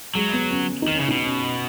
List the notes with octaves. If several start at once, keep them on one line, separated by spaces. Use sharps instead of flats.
F#3 G#3
B3
C#4
D#4
D#3
C#3 C#4
B2 D#4
C#4